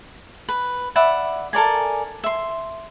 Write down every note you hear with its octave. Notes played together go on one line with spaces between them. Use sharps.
B4
D5 E5 F#5 B5
A4 A#4 D5 G#5
E5 C6